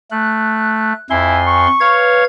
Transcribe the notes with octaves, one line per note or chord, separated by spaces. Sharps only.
A3 F#6
F2 E4 G#5 C6
C#6
B4 C#5 F5 G#6